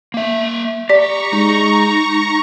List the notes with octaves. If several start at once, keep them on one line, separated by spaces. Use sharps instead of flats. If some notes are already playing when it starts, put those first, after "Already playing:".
A#3 E5
G4 D5 A#5 C#6
G#3 D#4